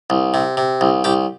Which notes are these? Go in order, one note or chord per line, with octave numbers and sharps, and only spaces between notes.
C2
C3
C3
C2
C2 G4